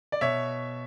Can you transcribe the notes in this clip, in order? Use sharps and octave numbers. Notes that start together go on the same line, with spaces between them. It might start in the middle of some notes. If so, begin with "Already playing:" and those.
D5
B2 C#5 E5